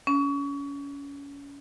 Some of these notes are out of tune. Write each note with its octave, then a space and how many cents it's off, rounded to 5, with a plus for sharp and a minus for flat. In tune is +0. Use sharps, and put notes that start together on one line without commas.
C#4 +30